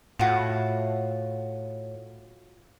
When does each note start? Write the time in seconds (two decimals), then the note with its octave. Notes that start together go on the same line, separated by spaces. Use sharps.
0.19 A2 F4 F#4